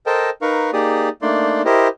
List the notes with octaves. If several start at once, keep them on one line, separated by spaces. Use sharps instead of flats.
A4 A#4 C5 D#5 G5 A5
D#4 A#4 B4 F5 C#6
A#3 D#4 G4 G#4 D5 D#6
A3 A#3 D4 D#4 D5 C6
E4 G4 A#4 C5 D#5